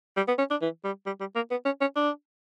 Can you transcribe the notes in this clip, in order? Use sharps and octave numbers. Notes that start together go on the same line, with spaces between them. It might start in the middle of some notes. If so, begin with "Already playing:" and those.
G3
B3
C#4
D4
E3
G3
G3
G3
A#3
B3
C#4
C#4
D4